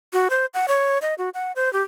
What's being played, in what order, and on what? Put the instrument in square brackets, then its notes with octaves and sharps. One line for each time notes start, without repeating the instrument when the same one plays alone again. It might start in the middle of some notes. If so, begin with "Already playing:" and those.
[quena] F#4
C5
F#5
C#5
D#5
F#4
F#5
C5
G4